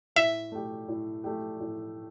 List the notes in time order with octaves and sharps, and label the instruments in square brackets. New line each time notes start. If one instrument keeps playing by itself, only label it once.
[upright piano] A2 [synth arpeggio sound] E5
[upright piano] A3 G4
A2
A3 G4
A2